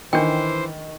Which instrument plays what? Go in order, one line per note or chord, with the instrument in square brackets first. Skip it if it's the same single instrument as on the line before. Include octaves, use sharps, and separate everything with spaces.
[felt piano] D#3 [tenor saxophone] E3 [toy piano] D4 G5 [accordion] C5